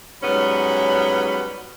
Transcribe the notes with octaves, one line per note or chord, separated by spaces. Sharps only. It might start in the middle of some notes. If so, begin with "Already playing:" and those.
G#2 F#3 G3 B3 C#4 B5